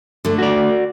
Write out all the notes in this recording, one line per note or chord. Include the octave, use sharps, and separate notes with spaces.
D3 A3
F#4 D5